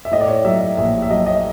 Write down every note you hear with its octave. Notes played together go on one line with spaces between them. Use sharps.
E5
A2 D#5
D5
C#5
F#3 E5
E5
A#1 E5
E5
F#3 D#5
D#5